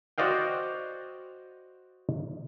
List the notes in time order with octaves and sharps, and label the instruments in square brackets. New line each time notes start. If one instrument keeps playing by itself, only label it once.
[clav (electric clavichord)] F#4 C5 D5 D#5 F5 G5